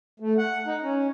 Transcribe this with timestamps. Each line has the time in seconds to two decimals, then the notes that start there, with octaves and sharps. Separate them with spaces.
0.20 A3
0.38 F#5
0.66 D#4
0.82 C#4